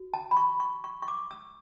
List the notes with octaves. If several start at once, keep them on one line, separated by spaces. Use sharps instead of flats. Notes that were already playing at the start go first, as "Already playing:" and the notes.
Already playing: F#4
A5
B5
C#6
C#6
C#6
C#6
D6
E6